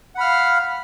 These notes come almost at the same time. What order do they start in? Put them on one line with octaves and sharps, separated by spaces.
F#5 B5 F6 F5